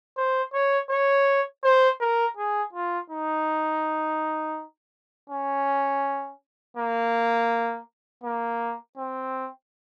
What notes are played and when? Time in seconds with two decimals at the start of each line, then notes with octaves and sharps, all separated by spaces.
0.17 C5
0.53 C#5
0.90 C#5
1.64 C5
2.00 A#4
2.37 G#4
2.73 F4
3.10 D#4
5.30 C#4
6.77 A#3
8.24 A#3
8.97 C4